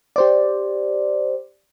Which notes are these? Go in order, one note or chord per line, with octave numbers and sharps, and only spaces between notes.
G4 C5 D5